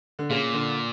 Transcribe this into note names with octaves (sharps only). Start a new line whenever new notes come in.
D3
A#2 C#3
D3